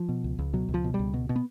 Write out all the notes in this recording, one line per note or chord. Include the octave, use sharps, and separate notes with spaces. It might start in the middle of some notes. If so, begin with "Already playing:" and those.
Already playing: F3
B2
C#2
C#2
B2 F#3
C#2
F3
B2
G3
C#2
B2
B2
B3